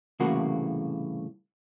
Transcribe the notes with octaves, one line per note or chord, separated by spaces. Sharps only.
C2 A2 C#3 E3 A#3 F#4